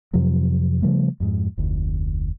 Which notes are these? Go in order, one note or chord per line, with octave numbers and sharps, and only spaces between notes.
F2 C3 F3 F#3
C#3 F3 G3 A3
F2 G#2
F1 D2